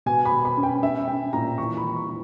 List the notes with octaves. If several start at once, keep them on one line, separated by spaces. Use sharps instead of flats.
B2 G#5
B5
B2
B5
C#4
G5
C#4 E5
C#4 G5
A#2 A#5
E3 C#6
B5
E3
C#6
E3